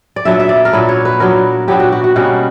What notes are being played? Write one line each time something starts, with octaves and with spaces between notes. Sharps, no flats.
D5
A#2 F#3 B3 D4 E5
E5
D5
A#4
A#2 F#3 B3 D4 B4
C#5
B4
A#2 F#3 B3 D4 A#4
A#2 F#3 B3 D4 G4
F#4
F#4
F#4
B2 G3 A#3 C#4 F#4